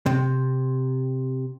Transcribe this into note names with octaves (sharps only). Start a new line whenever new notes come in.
C3